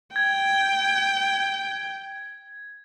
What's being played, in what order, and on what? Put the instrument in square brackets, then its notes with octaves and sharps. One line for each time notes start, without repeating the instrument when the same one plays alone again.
[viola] G5 [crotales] G#6